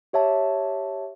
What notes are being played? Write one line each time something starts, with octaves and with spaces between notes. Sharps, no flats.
G4 C#5 E5 A5